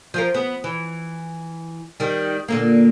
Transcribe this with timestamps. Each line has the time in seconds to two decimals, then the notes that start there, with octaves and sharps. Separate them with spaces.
0.14 F3 F4 A#4
0.34 B3
0.64 E3
2.00 D#3 G3
2.48 A#2 D3 A#3